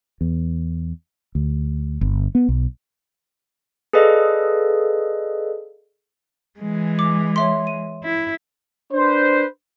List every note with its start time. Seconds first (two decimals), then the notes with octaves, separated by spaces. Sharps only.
0.21 E2
1.35 D2
2.01 G1
2.35 B3
2.49 B1
3.93 G#4 A4 B4 D5 D#5 F5
6.59 E3 G#3
6.99 D6
7.36 C#5 E5 C6
7.67 D#7
8.04 E4
8.93 D4 B4 C5